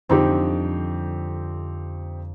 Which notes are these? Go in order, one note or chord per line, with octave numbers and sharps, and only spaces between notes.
F2 D3 G3 C4 D#4 G4